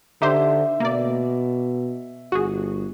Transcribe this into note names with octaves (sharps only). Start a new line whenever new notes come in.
D3 D#4 G4 C5 E5
B2 A#3 D5
G1 F#4 G#4